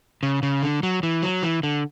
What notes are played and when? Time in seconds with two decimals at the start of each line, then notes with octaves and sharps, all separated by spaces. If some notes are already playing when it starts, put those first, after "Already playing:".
0.23 C#3
0.43 C#3
0.63 D3
0.83 F#3
1.03 E3
1.22 F#3
1.43 E3
1.63 D3